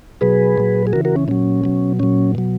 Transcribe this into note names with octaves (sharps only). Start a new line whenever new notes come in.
B2 F#3 G#4 B4
A#2 F#3
G#4
C#3 E3 F#4 A#4
F#4 A#4
C#4
A#2 F#3 C#4
B2 F#3
A#2 F#3 C#4
B2 F#3